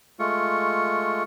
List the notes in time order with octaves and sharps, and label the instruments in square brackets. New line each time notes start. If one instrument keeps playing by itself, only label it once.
[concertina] G#3 A3 F4 C#6